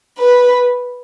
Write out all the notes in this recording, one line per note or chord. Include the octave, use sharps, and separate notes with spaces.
B4